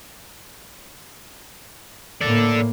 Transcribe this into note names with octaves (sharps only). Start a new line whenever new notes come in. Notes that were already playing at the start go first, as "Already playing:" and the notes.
A2 A#3 A4 D5